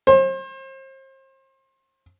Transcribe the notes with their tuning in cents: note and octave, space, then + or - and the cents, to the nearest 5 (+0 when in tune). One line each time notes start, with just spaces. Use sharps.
C5 +35